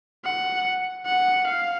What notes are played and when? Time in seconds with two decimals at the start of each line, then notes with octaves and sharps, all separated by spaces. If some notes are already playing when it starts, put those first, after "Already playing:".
0.25 F#5
1.06 F#5
1.47 F5